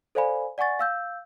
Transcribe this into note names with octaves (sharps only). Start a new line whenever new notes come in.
A4 C5 D5 F5 G#5 B5
D5 F#5 G#5 C#6 A6
F5 E6 G6